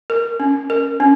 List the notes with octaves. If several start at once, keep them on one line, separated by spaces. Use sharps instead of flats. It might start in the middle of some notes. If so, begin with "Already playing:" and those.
A#4
C#4
A#4
C#4